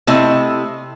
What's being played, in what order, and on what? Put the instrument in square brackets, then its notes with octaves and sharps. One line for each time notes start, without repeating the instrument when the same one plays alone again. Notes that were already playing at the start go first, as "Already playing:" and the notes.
[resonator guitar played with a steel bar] C3 A3 E4 D#5